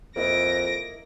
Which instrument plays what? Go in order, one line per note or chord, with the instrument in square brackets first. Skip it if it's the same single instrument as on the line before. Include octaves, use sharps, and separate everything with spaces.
[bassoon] F2 [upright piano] A#3 E4 D#5 [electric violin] A#6 D7